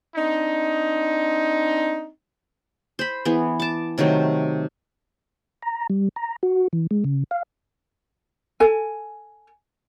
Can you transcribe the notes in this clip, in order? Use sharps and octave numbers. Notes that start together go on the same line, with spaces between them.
C4 D4 D#4
C5 B5
E3 B3 G#4
A5 D6
C3 D#3 F#3 A3
A#5
G3
A#5
F#4
E3
G#3
C#3
F5
A4 G#5